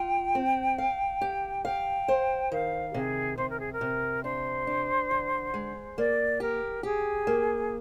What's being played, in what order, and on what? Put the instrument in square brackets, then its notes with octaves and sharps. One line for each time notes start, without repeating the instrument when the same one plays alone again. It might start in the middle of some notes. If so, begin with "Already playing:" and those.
Already playing: [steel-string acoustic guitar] F4 [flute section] G5
[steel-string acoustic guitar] C4
F5
G4
[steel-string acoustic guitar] F5 [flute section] G5
[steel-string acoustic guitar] C5
[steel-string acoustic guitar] D#3 [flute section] F5
[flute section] G4
[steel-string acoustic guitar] C3 [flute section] G#4
[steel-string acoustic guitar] C3 [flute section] C5
[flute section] A#4
G#4
A#4
[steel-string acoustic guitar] C3
[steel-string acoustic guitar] D4 [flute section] C5
[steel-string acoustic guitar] D4
D3
G#3
[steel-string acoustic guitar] A#3 [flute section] D5
[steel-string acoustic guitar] G4 [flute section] A#4
[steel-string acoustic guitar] G4 [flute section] G#4
[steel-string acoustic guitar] A#3